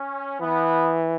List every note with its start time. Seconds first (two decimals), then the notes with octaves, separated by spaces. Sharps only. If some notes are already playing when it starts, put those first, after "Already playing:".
Already playing: C#4
0.41 E3 B3